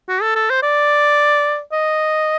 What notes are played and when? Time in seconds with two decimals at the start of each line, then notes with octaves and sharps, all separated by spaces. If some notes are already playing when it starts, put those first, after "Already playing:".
0.08 F#4
0.22 A4
0.35 A4
0.50 C5
0.63 D5
1.72 D#5